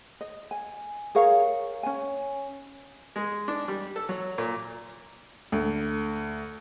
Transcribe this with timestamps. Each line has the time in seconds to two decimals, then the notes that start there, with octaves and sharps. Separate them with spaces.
0.21 D#5
0.51 G#5
1.15 G#4 A#4 C#5 F5
1.83 C#4 G#5
3.16 G#3
3.48 D4
3.68 G3
3.96 A4
4.09 F#3
4.38 A#2
5.52 D2